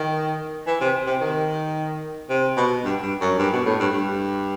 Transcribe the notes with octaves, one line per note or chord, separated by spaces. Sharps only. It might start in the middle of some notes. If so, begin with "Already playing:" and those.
Already playing: D#3
E3
C3
C3
D#3
C3
B2
G2
G2
F#2
G2
B2
A2
G2
G2